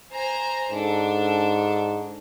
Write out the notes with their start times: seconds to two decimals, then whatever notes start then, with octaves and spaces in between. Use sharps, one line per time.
0.12 C5 G#5 A#5
0.71 G#2 D4 A4